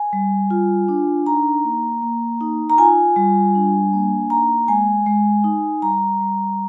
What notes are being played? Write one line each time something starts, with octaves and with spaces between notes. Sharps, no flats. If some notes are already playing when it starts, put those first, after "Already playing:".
Already playing: G#5
G3
F4
D4
D#4 A#5
A#3
A#3
D#4
A#5
F4 G#5
G3
D4
A#3
D#4 A#5
G#3 G#5
G#3
D#4
G3 A#5
G3